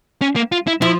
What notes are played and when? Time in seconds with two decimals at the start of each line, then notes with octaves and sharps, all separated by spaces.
0.22 C#4
0.36 A#3
0.52 F4
0.67 E4
0.82 F3 E4